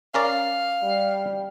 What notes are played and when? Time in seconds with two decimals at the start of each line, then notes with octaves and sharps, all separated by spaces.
0.14 C#4 A#4 D5 F5
0.82 G3